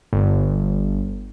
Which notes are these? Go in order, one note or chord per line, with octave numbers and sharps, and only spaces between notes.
G1